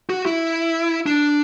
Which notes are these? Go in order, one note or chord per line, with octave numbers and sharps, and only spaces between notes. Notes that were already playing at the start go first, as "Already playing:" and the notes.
F#4
E4
D4